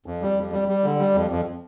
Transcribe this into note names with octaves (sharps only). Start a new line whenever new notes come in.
F2
G3
F2
G3
G3
D3
G3
F2
F2